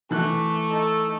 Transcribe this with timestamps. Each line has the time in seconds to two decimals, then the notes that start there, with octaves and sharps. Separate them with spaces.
0.11 E3 A3 F#6
0.70 D#4 A4